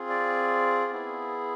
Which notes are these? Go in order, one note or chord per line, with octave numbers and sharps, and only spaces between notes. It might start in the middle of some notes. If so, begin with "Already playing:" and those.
Already playing: C4 F4 G#4
D5
B3 E4 G#4